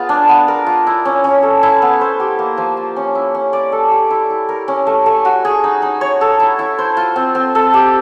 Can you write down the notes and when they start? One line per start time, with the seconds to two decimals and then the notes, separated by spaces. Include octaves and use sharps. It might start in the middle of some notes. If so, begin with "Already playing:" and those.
Already playing: B3 F4 G#4
0.09 D4
0.29 B3
0.48 A#4
0.67 F4
0.87 E4
1.05 C#4
1.24 C#4
1.43 A4
1.63 E4
1.82 B3
2.01 C5
2.20 G4
2.39 A#3
2.58 F3
2.77 F4
2.96 C#4
3.15 E4
3.35 C#4
3.53 D5
3.72 A4
3.91 G4
4.11 E4
4.30 E4
4.49 A#4
4.68 C#4
4.87 A3
5.06 A3
5.25 F#4
5.45 G#4
5.64 D#4
5.82 D#4
6.01 C#5
6.21 A4
6.40 E4
6.59 E4
6.79 C5
6.97 F4
7.16 C4
7.35 C4
7.55 A4
7.74 G4